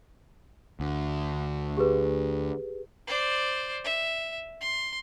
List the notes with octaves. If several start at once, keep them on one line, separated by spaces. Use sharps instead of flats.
D2
G4 G#4 B4
C5 D5
E5
C6